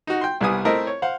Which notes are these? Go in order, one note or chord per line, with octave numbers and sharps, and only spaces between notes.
D#4 F#4
G5 C6
C2 G3 B3 G#5 D#6
A3 C4 E4 A#4 D#5 E5
C#5
C5 F5 F#5